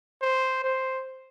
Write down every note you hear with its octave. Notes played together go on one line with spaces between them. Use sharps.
C5
C5